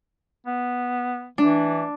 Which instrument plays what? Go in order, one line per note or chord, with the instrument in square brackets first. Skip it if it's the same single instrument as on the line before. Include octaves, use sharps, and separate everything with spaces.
[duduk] B3
[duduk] E3 [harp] D4